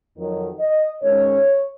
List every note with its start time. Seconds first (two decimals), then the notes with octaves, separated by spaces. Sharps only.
0.16 F2 D#3 F#3
0.59 D#5
1.01 G#2 D#3 G#3 C#4 C#5